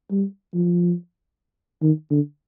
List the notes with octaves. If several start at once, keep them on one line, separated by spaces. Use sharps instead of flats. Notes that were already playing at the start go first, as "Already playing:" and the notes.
G3
F3
D#3
D3